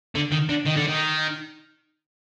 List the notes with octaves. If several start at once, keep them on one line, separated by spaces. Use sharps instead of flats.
D3
D#3
D3
D#3
D3
D#3